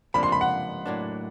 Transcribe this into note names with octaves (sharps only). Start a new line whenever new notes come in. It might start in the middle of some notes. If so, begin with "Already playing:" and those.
C#2 C3 F3 A#3 D4 B5
C6
B5
F#5
A2 F#3 A#3 D4